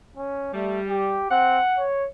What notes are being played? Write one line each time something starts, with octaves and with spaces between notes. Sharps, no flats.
C#4
G3 A3
G4
C4 F#5
C#5